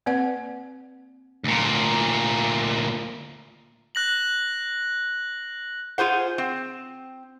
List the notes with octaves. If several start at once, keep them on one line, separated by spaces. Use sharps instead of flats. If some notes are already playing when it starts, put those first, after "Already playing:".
A#3 C4 B4 D5 F#5
D2 A#2
F#6 A#6 F#7
F4 G#4 C5 F#5
C4